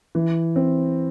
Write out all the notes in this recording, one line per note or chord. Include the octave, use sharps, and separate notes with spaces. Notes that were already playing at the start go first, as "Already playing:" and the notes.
E3
C4